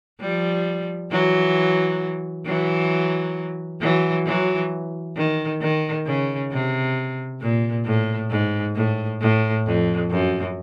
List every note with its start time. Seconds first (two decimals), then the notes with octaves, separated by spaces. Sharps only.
0.21 F3 G3
1.11 E3 F#3
2.46 E3 F#3
3.81 E3 F#3
4.26 E3 F#3
5.16 D#3
5.61 D#3
6.06 C#3
6.51 C3
7.41 A#2
7.85 A2
8.30 G#2
8.76 A2
9.21 A2
9.66 F2
10.10 F#2